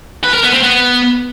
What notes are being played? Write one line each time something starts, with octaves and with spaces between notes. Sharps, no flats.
B4
A#4
B3
C4
B3